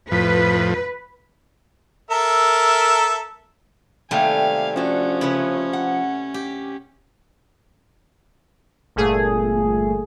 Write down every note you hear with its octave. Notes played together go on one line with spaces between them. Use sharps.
F2 A2 F3 B4
A4 A#4 E5
C3 D#3 G3 A3 A#3 F5 G5 G#5
F3 C#4 D4 F#4 A4
C#3 E4 B4 C#5
F#5
G4
G1 A#2 A3 G#4